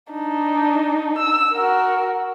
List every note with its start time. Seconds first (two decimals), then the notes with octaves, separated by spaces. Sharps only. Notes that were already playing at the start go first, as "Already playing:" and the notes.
0.12 D4 D#4
1.18 E6
1.53 F#4 A#4